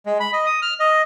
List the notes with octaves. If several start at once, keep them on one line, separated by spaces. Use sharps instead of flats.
G#3
B5
D#5
D#6
F6
D#5